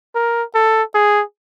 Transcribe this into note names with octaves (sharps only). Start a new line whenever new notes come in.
A#4
A4
G#4